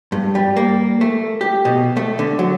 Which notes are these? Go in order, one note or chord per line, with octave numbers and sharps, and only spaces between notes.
G2
G3
A#3
A3
G4
B2
A3
D3
F#3